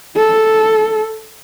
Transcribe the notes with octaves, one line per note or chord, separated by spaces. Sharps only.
A4